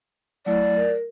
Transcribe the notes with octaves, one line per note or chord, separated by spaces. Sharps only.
F#3 A3 E4 D5
A#4